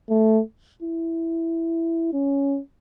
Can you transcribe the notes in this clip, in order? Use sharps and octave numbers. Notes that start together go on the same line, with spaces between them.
A3
E4
C#4